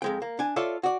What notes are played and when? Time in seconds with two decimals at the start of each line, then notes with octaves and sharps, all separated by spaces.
0.02 F2 G#3 G5
0.22 A#3
0.39 D4 G#5
0.56 F4 A4 C#5 D5 E5
0.83 F#4 D5